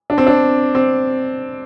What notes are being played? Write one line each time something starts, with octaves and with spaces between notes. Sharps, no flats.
D4
C4
D4
C4